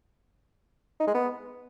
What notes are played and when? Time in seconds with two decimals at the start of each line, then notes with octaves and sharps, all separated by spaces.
1.00 D#4
1.07 G#3
1.14 B3